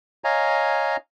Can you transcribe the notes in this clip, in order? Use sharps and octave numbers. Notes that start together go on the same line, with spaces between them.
C#5 D#5 F5 G#5 A#5